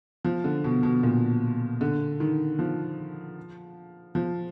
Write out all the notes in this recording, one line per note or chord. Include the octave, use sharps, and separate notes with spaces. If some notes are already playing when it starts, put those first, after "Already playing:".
F3
D3
B2
B2
A#2
D3
D#3
F3
F3